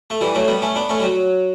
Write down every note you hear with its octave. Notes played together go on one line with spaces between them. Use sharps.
A3
E3 G3
F#3 A3
G3 B3
A3 C#4
B3 D4
A3 C#4
G3
F#3